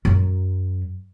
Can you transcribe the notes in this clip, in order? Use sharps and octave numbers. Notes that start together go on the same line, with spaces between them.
F#2 F#3